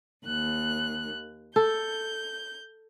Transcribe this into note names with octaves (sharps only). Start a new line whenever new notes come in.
D#2 F#6
A4 G6